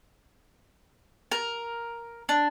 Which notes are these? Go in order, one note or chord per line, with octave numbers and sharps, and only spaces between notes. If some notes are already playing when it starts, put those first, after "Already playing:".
A#4
D4